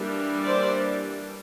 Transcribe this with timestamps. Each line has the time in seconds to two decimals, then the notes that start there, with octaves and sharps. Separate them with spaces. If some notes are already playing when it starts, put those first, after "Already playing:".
Already playing: E3 G3 A#3 D4
0.45 C5 D5